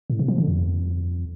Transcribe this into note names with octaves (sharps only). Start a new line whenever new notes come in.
A2
C3
F3
D3
F2